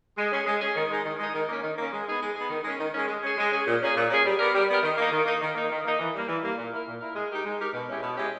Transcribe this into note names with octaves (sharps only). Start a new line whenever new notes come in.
G#3
C#4 G#4
G#3
C#4 G#4
D#3
G#3 D#4
D#3
G#3 D#4
D#3
A#3 C#4
D#3
A#3 C#4
G#3
B3 D#4 G#4
G#3
B3 D#4 G#4
D#3
G#3 C#4
D#3
G#3 C#4
G#3
C#4 G#4
G#3
C#4 G#4
A#2
A#3 C#4 G#4
A#2
A#3 C#4 G#4
G3
B3 G4 A#4
G3
B3 G4 A#4
D#3
A#3 D#4
D#3
A#3 D#4
D#3
A#3 D#4
D#3
A#3 D#4
E3
G3 A#3
E3
G3 A#3
A#2
A#3 E4 A#4
A#2
A#3 E4 A#4
G#3
D#4 G4 A#4
G#3
D#4 G4 A#4
B2
G#3 C#4 E4 G4
B2
G#3 C#4 E4 G4